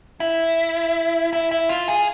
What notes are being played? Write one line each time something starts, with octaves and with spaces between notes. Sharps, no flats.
E4
E4
E4
F4
G#4